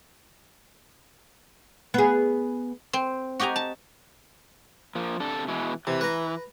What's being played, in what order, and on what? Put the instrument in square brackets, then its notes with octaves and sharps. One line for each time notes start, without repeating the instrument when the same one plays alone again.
[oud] B3 G#4
[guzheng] C4
F#4 G4 D#5 G#5 A#5
A5
[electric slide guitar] F3 A#3
C3 D4 A4
B2 E3 G#3
[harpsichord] C3 [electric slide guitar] E3
[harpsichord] B4 A#5